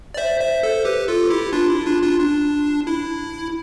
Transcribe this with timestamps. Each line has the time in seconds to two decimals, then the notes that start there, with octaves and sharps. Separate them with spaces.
0.14 D5
0.17 C5 E5
0.41 C5 E5
0.63 A4 C5
0.85 G4 B4
1.08 F4 A4
1.30 E4 G4
1.53 D4 F4
1.70 E4
1.86 D4 F4
2.03 D4 F4
2.19 D4
2.87 E4